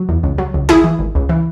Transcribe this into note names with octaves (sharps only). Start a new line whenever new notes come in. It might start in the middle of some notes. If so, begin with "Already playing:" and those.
Already playing: F#3
E2
C#2
F#3
C#2
G#1 E4 G#4
E3
G#1
C#2
E3